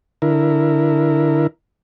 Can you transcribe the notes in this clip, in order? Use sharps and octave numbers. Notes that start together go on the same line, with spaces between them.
D3 E4 A#4